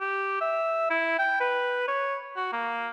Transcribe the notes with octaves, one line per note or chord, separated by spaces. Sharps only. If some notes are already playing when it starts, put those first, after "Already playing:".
G4
E5
E4
G5
B4
C#5
F#4
A#3